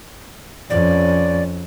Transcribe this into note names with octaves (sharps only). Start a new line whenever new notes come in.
F2 C#4 D5